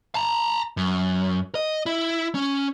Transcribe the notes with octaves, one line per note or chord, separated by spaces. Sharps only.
A5 A#5
F#2
D#5
E4
C#4